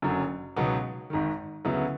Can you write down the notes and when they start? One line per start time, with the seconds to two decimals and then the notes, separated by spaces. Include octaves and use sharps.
0.02 F#1 F#2 D3 F#3
0.56 C#2 B2 F#3 B3 D#4
1.10 G#1 G#2 D#3
1.65 D2 C#3 F#3 B3 E4